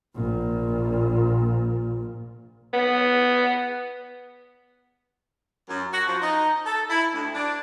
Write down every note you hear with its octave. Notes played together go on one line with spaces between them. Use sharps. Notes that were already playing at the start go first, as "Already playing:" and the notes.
A#1 A#2
B3
F#2
F#4
F3
D#4
A4
E4
D2
D4